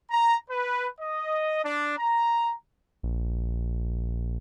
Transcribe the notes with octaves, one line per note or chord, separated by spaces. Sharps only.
A#5
B4
D#5
D4
A#5
A#1